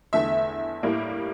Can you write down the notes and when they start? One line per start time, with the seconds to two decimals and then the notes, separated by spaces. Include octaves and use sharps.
0.13 E2 D3 A3 E5
0.83 A2 G3 A#3